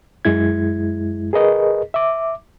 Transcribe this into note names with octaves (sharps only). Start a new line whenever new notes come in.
F#2 G#3 E4 G#6
G#4 A#4 B4 D#5
E5 D6